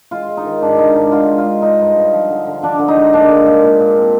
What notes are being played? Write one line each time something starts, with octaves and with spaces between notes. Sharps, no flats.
G#3 F4
G#3
D#4
D#3
G#2 D4
G#3 D#4
G#2 D4
D3 F4
G#3
F4
G#3
G#3 D#4
G2
G2
F3
D3
D3
F3 D4
D3
D#4
G#3
A#2 D4
G#3
A#2
A#2
A#2
C4